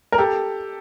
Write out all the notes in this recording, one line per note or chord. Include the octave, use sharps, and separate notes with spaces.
A#4
G4 A4